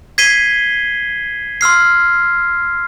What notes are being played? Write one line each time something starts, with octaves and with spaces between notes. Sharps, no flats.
G#6 B6 C7 D#7 G7
C6 E6 F6 C7